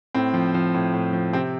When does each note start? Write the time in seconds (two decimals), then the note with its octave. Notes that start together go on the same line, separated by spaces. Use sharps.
0.15 A2 C4
0.34 F3
0.54 F3
0.74 A2
0.94 A2
1.13 F3
1.33 C3 C4